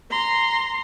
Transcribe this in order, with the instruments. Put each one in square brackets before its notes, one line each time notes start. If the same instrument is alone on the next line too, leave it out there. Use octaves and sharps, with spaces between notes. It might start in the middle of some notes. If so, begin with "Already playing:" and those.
[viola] A#5 C6